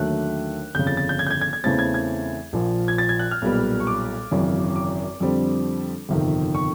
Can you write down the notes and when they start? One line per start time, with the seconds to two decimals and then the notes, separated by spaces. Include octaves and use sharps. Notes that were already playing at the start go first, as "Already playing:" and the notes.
Already playing: D#2 D3 F#3 A3 F#6
0.75 G1 F2 C#3 G6
0.87 A6
0.97 A6
1.09 G6
1.19 G#6
1.27 G6
1.31 G#6
1.41 G#6
1.53 G#6
1.64 E2 C#3 E3 A3 C4 A6
1.79 G#6
1.94 G#6
2.53 A#1 A#2 F3
2.88 G#6
2.98 A6
3.09 G#6
3.19 F#6
3.31 F6
3.42 B1 A#2 G3 B3
3.80 C#6
3.87 D6
4.31 G#1 F#2 C#3 E3
4.76 D6
5.20 F2 D3 G3 C4
6.09 G1 F2 C3 D#3
6.55 C#6